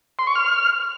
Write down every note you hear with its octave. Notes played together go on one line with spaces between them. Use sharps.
C6
C#6
F6